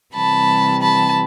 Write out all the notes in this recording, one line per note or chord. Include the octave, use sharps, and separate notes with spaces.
C3 E3 G3 A5 B5
A5 B5